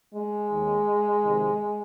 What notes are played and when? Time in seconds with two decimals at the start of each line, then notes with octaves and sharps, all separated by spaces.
0.14 G#3
0.50 D#2 D#3
1.22 F2 C3 D#3